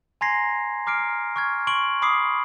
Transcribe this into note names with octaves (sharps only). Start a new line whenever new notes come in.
G#5 A#5 C6 G#6 A#6 C7
A#5 D6 F6 C7 D7
C#6 F6 G#6
C6 C#6 D7 F#7
B5 D6 D#6 C7